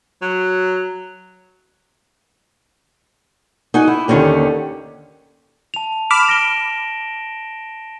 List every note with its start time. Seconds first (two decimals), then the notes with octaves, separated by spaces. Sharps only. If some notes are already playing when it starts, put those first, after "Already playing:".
0.22 F#3
3.74 D#4 F#4 G#5
3.87 E4
4.08 D#2 D3 D#3 C4 C#4 G4
5.74 A5 F7
6.11 B5 D6 F6 E7
6.29 A#6 D7 G7